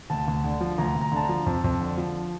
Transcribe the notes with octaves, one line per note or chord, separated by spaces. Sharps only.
D2 A5
D2
D3
F3
D2 A#5
D2
A#5
D3 A5
A#5
F3
F2 A5
F2
D3
F3